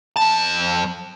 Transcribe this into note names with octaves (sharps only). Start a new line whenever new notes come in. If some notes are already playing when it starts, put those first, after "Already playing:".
F2 A5